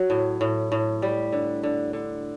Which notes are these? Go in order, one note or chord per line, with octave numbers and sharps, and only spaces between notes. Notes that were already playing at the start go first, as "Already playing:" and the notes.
Already playing: F#3
A2
A2
A2
G3
D3
D3
D3